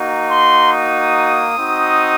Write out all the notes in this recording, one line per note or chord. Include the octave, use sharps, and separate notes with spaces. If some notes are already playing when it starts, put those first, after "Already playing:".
Already playing: A#3 D#4 F#4
C6
D#6
C4 D#4 F#4